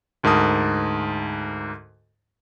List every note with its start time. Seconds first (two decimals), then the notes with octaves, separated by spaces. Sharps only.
0.23 D2 G#2 A#4 A5 D#6